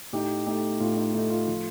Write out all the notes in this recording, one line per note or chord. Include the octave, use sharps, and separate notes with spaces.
A2 D#4 G4
A3 D#4 G4
A2 F4
D#4
A3 D#4
F4
F3